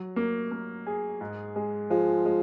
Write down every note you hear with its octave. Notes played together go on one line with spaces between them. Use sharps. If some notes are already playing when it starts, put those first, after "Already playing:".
Already playing: F#3
A#3
A#3
G#4
G#2
G#3
F3 G#3
G#3